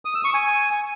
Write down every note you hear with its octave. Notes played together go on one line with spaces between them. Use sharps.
D#6
E6
C#6
G#5